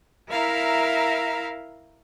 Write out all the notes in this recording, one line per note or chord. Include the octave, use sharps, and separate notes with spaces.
E4 A#4 E5 F5 A#5